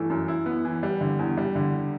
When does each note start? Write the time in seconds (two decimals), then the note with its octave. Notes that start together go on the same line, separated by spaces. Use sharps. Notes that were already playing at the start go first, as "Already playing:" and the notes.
Already playing: G2 E3 A3
0.10 F#2
0.28 E4
0.46 B3
0.65 E3
0.83 G3
1.01 D3
1.19 E2
1.38 G3
1.55 D3